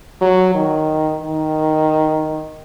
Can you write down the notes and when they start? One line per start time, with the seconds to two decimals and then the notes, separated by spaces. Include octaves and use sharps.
0.21 F#3
0.55 D#3
1.22 D#3